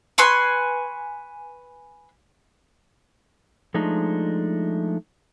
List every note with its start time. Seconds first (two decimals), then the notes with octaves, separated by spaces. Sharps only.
0.18 B4 G#5 C6 C#6
3.74 F3 G#3 A3 D4 D#4